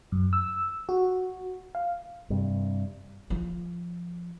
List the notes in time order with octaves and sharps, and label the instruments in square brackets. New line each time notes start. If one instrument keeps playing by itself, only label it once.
[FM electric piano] F#2
E6
F#4
F5
[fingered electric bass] G2 C3
[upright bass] F3